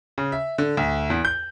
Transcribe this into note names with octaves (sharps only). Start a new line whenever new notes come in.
C#3
E5
D3
D2
E2
G6